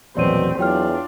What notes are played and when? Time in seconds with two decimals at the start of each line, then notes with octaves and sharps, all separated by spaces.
0.17 A#1 E2 B2 F#3 A3 C4 D5 D#7
0.59 E2 F#3 D4 F4 C#5 G5 F6